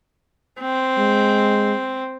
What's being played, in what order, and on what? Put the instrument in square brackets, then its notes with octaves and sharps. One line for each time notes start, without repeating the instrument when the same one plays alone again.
[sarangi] C4
[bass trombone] G#3